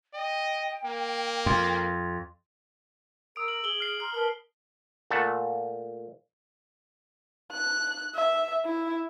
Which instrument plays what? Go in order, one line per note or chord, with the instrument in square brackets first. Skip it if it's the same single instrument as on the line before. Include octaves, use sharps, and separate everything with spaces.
[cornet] D#5 [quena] G5
[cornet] A#3
[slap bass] F2 [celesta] C6
[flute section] A#4 E6 [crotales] D#6 D7
[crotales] F#7
[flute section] G#4 [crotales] F#7 G7
[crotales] F6 C7 D7
[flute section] A#5 C6 [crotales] F6
[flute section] A#4 B4 A5 [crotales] F6
[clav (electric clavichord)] A#2 A3 F#5 A5
[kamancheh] F#6
E5
E4